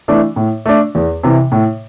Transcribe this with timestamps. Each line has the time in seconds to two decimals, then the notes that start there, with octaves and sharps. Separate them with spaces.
0.08 E3 A3 D4
0.36 A2
0.66 A3 D4
0.95 E2
1.23 C3 E3
1.52 A2